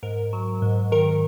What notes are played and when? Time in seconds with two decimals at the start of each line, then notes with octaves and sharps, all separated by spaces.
0.03 G#2 A#4
0.33 F#3
0.62 G#2
0.92 D#3 A#4